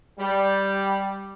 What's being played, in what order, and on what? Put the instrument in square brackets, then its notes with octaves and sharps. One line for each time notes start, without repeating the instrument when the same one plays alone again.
[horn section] G3